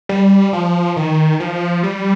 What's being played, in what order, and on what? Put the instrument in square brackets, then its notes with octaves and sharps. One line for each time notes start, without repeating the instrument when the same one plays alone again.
[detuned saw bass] G3
F3
D#3
F3
G3